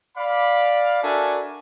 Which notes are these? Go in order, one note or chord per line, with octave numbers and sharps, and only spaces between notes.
D5 F5 B5
D4 F#4 A4 A#4 E5 G#5